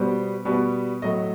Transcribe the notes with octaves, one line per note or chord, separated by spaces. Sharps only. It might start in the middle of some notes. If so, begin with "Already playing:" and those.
Already playing: B2 G3 B3 C5
B2 G3 B3
A2 F#3 A3 D#5